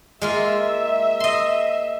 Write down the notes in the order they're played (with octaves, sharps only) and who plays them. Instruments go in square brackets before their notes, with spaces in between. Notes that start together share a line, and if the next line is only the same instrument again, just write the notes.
[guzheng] G#3 A#3 F4 [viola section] E5
[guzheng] D#5 C6